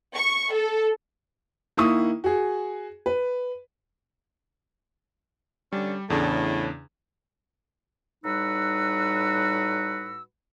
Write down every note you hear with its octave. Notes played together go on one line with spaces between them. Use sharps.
C#6
A4
D#3 A#3 E4 C#6 D#6
F#4 G#4
B4
D3 G3 C#4 D4
E2 A2 C#3 D4
A2 G3 D#4 F#4 B4 E6